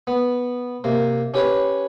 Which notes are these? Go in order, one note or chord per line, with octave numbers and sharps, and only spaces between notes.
B3
C3 A#3
C#4 G4 B4 C#5